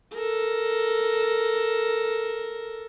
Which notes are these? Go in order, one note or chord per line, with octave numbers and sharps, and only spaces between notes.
A4 A#4